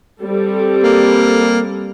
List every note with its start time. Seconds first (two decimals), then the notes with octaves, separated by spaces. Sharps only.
0.20 G3 C4 A4
0.83 A#3